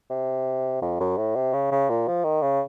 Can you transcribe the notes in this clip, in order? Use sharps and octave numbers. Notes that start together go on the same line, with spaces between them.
C3
F2
F#2
A2
C3
C#3
C#3
A#2
F3
D#3
C#3